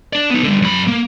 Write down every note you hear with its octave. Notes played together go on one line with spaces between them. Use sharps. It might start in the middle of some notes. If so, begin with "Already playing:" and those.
D4 D5
B3 D#4
D3 G3
F#2 B5
A#3